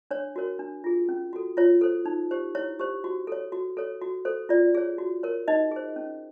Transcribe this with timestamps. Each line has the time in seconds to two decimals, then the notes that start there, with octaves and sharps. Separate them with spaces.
0.11 D4 C#5
0.36 F#4 A#4 C#5
0.59 D4
0.84 F4 G#4
1.09 C#4
1.33 F#4 A4
1.57 F4 C#5
1.81 A4 C5
2.06 D#4
2.31 G4 C5
2.55 E4 C#5
2.79 G4 C5
3.04 F#4
3.27 A4 C#5
3.52 F#4
3.77 A4 C#5
4.02 F#4
4.25 A4 C5
4.49 F4 D5
4.75 G#4 C#5
4.98 F#4
5.23 A#4 C#5
5.48 D#4 D#5
5.71 G#4 C5
5.96 C#4